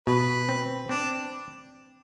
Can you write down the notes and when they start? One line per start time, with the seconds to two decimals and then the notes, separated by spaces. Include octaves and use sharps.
0.07 B2 B4
0.49 C4
0.89 C4 D4